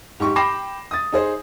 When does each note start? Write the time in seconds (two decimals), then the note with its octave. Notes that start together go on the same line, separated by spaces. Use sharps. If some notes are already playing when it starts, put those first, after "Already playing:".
0.20 G#2 G4 C#6
0.36 G5 B5 D6 A#6 C7 E7
0.91 D#6 A6
1.12 D#4 G#4 C5